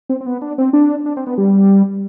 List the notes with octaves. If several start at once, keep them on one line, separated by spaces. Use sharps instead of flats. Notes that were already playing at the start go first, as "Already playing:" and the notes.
C4
C4
B3
D4
C4
D4
D4
C4
B3
G3